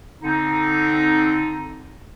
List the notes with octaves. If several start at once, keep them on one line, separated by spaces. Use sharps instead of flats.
D3 C4 D#4